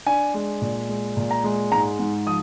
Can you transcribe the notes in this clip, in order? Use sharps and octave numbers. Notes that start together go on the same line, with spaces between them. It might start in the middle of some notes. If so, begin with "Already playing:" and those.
D4 G#5
G#3
A#2
G#3
A#2
A#5
G#3
G#2 A#5
G#2
F3 D#6